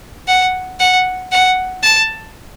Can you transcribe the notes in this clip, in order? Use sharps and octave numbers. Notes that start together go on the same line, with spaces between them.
F#5
F#5
F#5
A5